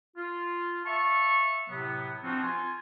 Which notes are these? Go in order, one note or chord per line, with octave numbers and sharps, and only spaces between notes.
F4
E5 F5 A5 C#6
A2 C3 F#3 B3
F3 C4 D4 D#4 F4 F#4
F4 G#5